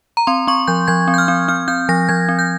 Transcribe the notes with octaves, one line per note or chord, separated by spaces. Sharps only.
A#5
C4 C6
C4 C#6
F3 G6
F3 G#6
C4
G6
F6
C4
C4 F6
C4 G6
F3 A#6
F3 G#6
C4
G6